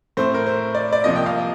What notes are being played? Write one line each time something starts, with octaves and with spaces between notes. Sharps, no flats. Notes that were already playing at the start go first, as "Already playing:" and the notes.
A2 A3 C4 C5
A#4
C5
D5
D5
C2 C3 F3 A#3 D#5
G5
F5